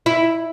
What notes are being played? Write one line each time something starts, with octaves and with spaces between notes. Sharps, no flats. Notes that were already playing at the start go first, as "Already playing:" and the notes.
E4